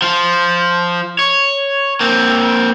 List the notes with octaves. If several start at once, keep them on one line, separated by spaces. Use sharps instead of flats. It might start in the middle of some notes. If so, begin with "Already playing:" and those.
F3 F4
C#5
A#3 C4